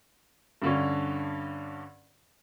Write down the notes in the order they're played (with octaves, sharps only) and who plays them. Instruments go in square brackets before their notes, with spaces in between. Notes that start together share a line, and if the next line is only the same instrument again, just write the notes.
[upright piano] G2 D3 C#4